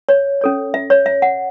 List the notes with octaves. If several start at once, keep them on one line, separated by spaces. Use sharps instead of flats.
C#5
C#4 A4 C#5
E5
C#5
E5
F#5